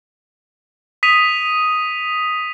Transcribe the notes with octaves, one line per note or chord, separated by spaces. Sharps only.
D#6 B6 D#7 F7